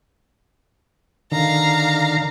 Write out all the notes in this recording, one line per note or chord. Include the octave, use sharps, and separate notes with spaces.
D3 D#3 F5 A#5